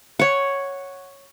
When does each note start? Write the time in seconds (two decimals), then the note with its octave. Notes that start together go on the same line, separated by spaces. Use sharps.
0.19 C#5 F#5